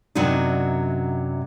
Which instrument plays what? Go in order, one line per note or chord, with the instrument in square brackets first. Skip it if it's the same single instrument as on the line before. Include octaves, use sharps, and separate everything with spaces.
[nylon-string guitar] F#2 C3 F#3 D4 D#4